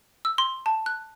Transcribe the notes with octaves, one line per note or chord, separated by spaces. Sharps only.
E6
C6
A5
F#6